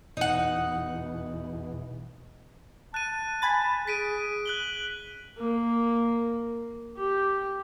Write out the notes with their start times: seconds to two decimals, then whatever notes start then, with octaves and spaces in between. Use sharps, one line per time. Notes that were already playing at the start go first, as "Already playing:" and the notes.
0.17 E2 B2 D#4 F#5
2.94 A5 F#6 D#7
3.42 G#5 B5 A6
3.87 G#4 B6 D7 D#7
4.46 F#6 F#7 G7
5.38 A#3
6.97 G4